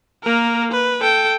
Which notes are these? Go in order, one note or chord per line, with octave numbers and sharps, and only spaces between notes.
A#3 A#4
B4
A4 G5